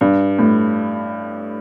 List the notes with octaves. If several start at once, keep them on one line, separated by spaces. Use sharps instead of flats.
G2
A2